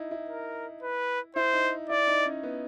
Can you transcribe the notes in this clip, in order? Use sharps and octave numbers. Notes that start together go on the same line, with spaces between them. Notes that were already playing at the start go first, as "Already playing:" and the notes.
Already playing: D#4 E4
E4
A#4
B4
E4 C5
D#4
E4 D5
D#4
C#4
B3